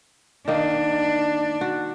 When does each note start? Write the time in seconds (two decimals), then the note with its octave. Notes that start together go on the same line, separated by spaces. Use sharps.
0.48 D#3 A#3 D4
1.61 F#4